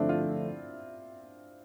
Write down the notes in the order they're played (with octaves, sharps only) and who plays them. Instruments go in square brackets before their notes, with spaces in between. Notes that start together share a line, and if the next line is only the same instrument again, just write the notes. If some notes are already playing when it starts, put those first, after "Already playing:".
Already playing: [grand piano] D3 F3 A3 [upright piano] C4 D4 E4
[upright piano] F4